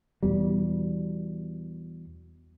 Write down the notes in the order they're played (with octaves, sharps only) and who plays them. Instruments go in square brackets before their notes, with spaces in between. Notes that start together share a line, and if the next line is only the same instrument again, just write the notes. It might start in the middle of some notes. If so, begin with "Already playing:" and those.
[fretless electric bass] E2 B2 G3